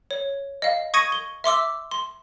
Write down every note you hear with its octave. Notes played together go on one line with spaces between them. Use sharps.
C#5
D#5 F5
C#6 D#6 G#6 A#6 C#7 D#7
G7
E5 C6 D6 E6
C6